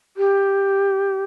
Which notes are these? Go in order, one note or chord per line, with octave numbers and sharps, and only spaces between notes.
G4